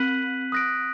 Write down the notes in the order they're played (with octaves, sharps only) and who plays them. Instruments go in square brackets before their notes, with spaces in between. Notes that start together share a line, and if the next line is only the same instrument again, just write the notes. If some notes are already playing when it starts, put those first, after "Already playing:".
Already playing: [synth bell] C4 [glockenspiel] F#6 B6 D#7 F#7
[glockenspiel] D#6 F#6 A#6 D7